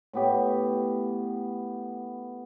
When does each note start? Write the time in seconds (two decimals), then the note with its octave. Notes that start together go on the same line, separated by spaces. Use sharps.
0.13 A2 B3 G4 C#6